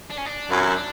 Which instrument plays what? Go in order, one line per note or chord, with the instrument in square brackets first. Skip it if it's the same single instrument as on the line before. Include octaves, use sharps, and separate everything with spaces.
[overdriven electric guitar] D4
C#4
D4
[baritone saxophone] F#2 [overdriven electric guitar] E4
[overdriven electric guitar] D4